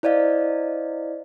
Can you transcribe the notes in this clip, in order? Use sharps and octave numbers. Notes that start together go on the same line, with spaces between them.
E4 C5 D5 D#5 F5